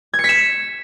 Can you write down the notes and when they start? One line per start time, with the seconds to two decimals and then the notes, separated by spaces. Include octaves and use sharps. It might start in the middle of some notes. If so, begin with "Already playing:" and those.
0.14 G#6
0.19 C#7
0.24 B6
0.29 E7